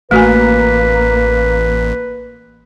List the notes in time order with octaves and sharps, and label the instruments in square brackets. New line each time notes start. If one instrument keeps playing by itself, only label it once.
[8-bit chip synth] A1 [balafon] A3 F#4 G#5 [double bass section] A#3 [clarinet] B4